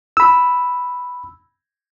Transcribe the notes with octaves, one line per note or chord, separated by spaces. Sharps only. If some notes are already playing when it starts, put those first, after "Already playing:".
B5 E6